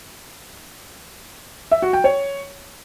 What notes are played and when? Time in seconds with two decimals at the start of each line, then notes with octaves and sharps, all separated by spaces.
1.71 E5
1.82 F#4
1.93 G5
2.04 C#5